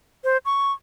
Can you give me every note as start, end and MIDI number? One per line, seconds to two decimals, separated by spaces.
0.24 0.37 72
0.45 0.72 85